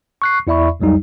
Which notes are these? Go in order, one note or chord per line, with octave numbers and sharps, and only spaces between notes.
C#6 F#6 C7
E2 E4 D5 E5 B5 C#6
C2 F2 F#3 G3 D#4